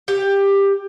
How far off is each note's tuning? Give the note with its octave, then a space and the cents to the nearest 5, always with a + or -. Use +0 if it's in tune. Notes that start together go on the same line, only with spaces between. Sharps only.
G4 +15